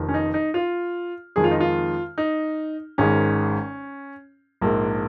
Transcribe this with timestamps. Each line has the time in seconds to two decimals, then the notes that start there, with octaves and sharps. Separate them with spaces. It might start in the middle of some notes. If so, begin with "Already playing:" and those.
Already playing: F1 F2 D#3
0.09 C#4
0.14 D#4
0.34 D#4
0.54 F4
1.36 F2 D#3 G#3 G#4
1.44 F4
1.51 D#4
1.60 F4
2.18 D#4
2.98 G#1 G#2 D#3 G#3 C#4
4.61 A#1 G#2 G#3 A#3